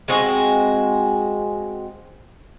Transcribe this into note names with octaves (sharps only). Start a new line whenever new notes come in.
G#3 C4 F#4 G#4